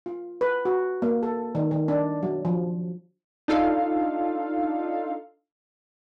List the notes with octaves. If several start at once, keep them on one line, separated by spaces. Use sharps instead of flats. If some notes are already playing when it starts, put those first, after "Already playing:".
F4
B4
F#4
A#3
A4
D#3
D#3
D4
F#3
F3
D4 D#4 F4 A4 F5